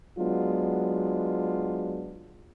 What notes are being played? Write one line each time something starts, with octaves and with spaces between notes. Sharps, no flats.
F#3 G#3 B3 D4 F4